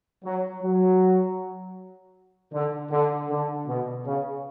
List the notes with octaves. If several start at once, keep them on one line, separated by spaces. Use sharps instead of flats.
F#3
F#3
D3
D3
D3
B2
C#3